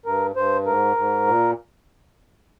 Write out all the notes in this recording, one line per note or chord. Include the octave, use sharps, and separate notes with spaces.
G2 A#4
G2 C5
G#2 A#4
G#2
A#2